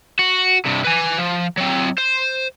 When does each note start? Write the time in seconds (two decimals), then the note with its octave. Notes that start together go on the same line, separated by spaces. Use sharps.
0.19 F#4
0.65 G2 C3
0.84 B4 G#5
1.18 F3
1.57 F#3 C4
1.98 C5